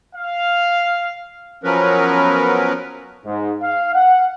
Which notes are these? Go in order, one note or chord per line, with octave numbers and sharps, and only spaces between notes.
F5
F3 F#3 B3 C#4 A#4 B4
G#2
F5
F#5